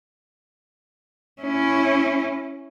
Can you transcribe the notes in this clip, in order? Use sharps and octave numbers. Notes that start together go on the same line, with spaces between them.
C#4 E4